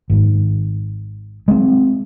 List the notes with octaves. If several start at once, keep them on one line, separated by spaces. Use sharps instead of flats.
G#1 G#2
G#3 B3 C4